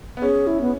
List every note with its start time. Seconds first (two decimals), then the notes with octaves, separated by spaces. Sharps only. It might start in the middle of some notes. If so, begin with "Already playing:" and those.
0.17 B3
0.22 C#4 G#4
0.47 E4
0.61 B3